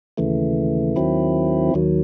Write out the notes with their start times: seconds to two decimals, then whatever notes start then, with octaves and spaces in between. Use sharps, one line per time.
0.17 D#2 C#3 E3 A3
0.96 D#2 D#3 F#3 C4 E4
1.74 D#2 D#3 F#3